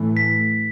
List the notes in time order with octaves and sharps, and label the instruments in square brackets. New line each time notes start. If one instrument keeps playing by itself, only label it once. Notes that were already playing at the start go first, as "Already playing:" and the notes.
Already playing: [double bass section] A2 E3 A3
[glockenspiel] B6